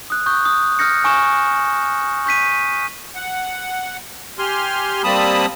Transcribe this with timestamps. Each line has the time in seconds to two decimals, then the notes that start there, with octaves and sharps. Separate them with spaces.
0.10 D#6 F#6
0.26 C#6 D#6 F#6 G6
0.46 C#6 D#6
0.79 D#6 F6 G6 A#6 C#7
1.04 G#5 C#6 F6 E7
2.26 C#6 G6 B6 D#7
3.15 F#5
4.39 G4 G#5 C6 F6
5.04 G3 A#3 C4 A5 B5 D#6